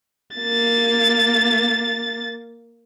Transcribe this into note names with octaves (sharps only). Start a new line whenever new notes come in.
A#3 A6